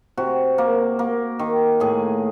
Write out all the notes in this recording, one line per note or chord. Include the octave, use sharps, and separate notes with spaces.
C3 F#4
A#3
A#3
D#3
A2 G#4